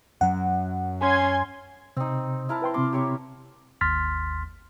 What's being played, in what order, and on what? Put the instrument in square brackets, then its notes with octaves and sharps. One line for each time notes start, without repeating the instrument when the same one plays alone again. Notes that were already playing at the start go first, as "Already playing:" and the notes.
[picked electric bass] F#2 F#3 [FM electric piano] F#5
[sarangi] C#4 [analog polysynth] G#5 C6 G#6
[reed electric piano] C3 [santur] C4 D#4
[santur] E4 A#4 A5
[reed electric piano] B4 G5 C6
[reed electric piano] C3 C4 C6 [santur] D6
[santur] G4 C#5 E5
[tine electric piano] G#1 D#2 C6 F6 A6 B6